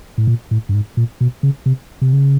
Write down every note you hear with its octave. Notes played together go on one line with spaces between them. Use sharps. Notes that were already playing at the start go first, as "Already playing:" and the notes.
A2
A#2
A2
G2
G#2
A#2
B2
C#3
C3
C3
C#3